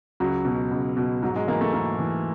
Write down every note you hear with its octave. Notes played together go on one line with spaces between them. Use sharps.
C#2 F#3
B2
C#2
B2
G#2 F#3
G#3
E3 A#3
A3
G#2 A#3
E3